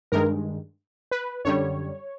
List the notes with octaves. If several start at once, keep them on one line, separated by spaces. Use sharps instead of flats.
G2 D#3 G#3 A#4
B4
F#2 D3 G3 C#5